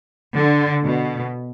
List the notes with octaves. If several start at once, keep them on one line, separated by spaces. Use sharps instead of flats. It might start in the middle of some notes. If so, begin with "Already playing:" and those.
D3
B2